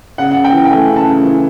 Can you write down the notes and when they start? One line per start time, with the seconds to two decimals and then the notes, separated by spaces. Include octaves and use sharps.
0.18 C#3 F#5
0.31 F#5
0.36 C#3
0.44 G5
0.53 E3
0.65 G5
0.71 A3 G#5
0.89 C#3
0.96 A5
1.06 C#3
1.22 E3